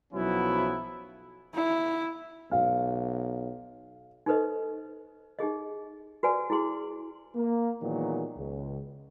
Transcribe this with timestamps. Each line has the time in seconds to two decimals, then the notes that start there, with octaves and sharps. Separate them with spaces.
0.13 B1 F3 F#3 B3 C#4 E4
1.55 E4
2.51 B1 F5
4.26 D#4 G4 A4 B4 C5 D#5
5.39 D#4 G4 G#4 D#5
6.23 F#4 G4 B4 C5 D5 G#5
6.50 E4 F#4 G#4 C6
7.36 A#3
7.82 A#2 D#3 E3 F#3 G#3 B3
8.37 C#2